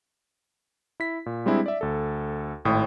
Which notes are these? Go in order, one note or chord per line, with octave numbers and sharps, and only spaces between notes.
E4 B6
A#2
G3 G#3 C4 D4 E4 G#4
D5 E5
D2 A4
G#1 A2 G5 D#6